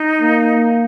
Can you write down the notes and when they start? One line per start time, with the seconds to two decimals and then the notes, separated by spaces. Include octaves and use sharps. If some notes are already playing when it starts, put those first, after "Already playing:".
Already playing: D#4
0.21 A#3